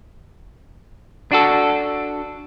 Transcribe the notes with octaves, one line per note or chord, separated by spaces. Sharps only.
D4 F#4 A4